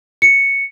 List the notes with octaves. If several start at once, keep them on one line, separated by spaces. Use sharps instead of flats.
C#7